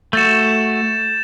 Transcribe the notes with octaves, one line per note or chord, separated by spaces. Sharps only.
A3 F#4 G6 A6 E7